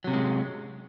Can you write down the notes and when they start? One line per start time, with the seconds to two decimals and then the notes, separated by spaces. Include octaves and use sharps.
0.04 F#3
0.07 C3
0.10 C#4
0.13 G#3